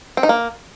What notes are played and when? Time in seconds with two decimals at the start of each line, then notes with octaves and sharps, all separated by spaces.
0.17 C4
0.23 D#4
0.29 A#3